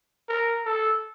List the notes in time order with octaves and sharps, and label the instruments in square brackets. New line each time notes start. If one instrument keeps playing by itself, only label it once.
[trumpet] A#4
A4